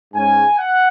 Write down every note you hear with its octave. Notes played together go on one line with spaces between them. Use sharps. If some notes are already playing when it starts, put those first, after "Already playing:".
G#2 G#3 C#4 G#5
F#5